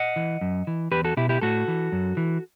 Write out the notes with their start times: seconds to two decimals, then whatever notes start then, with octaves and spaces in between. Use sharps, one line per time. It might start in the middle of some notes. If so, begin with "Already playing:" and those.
Already playing: D#5 F#5
0.16 E3
0.41 F#2
0.67 E3
0.92 E2 G4 B4
1.04 F#4 A4
1.17 B2 E4 G4
1.29 E4 G4
1.42 A2 F#4 A4
1.68 E3
1.92 F#2
2.17 E3